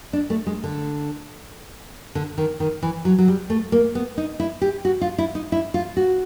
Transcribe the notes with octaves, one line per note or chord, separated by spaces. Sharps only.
D4
A3
G#3
D3
D3
D#3
D#3
E3
F#3
F#3
G3
A3
A#3
B3
D#4
E4
G4
F#4
F4
E4
D#4
E4
F4
F#4